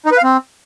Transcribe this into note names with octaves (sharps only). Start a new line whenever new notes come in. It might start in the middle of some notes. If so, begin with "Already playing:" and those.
D#4
B4
F5
C4